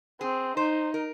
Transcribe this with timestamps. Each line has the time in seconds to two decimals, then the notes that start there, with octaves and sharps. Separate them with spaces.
0.21 C4 G#4
0.57 D#4 C5
0.94 A#4